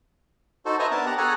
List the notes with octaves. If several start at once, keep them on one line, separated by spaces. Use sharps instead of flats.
D#4 F#4 A4 C5
B4 C5 D#5 E5 G#5 A#5
B3 D4 A#4 A5
G4 F#5 A#5
G#4 A4 C#5 F#5 G#5 A#5